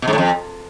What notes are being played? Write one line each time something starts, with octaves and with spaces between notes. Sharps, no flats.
B2
G#2
A2
F2